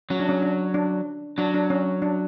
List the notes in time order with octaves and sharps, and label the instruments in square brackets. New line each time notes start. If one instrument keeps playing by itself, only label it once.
[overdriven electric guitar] F#3 [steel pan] C#4
[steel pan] D4
C#4
D4
D4
[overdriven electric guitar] F#3 [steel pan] D4
[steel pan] D4
C#4
D4